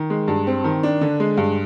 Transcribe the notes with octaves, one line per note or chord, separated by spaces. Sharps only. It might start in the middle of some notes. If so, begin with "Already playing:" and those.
Already playing: D#3
G#3
G2
C4
D#3
D4
D3
G#3
G2